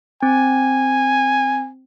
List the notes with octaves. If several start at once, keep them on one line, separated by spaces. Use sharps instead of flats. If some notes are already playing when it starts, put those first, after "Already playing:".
C4 G#5